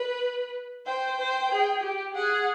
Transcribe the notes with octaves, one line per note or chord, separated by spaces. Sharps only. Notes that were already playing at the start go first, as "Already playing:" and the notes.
Already playing: B4
C5 G5
C5
G#4
G4
G#4 F#5